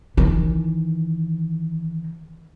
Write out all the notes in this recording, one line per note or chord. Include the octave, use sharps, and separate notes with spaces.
D#3 E3